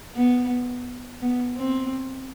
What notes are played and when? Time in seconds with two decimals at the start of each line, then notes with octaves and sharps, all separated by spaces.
0.15 B3
1.22 B3
1.58 C4